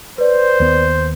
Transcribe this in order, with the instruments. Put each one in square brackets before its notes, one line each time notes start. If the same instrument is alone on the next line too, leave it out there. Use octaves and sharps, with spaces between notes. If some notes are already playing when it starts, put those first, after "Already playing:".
[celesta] B4 D5 [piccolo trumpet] C5
[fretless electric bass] D#2 B3